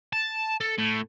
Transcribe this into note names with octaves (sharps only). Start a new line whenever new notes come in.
A5
A4
A2